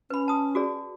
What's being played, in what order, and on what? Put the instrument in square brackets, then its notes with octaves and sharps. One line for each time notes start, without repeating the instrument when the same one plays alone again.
[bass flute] C#4 [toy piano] B4 B5
[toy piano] A5 D#6
F#4 G#4 D5